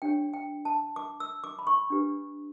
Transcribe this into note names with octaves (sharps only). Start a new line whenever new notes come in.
D4 G4 C#5 G5
G5
A5
D6
E6
D6
B5
C#6
D4 G4 B4